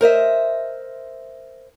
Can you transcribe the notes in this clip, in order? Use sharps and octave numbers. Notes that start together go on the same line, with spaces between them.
A#4 C5 D#5 E5